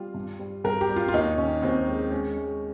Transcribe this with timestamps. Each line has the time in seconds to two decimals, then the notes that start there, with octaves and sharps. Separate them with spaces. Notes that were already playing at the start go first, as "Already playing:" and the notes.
Already playing: G3 F4
0.14 G2
0.39 G3
0.64 G2 A#4
0.81 G4
0.89 G3
0.96 F4
1.08 F4
1.14 D#2 D#4
1.37 D#3 C#4
1.62 D#2 C4
1.87 G#3
2.11 G#3 C#4
2.36 G#3